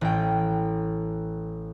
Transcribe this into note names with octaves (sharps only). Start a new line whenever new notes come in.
A1 G5